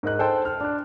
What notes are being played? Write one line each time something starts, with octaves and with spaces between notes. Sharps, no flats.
G#2 A#4 D#5 F#6
A4 C5 G5 A5
F6
D4 F#6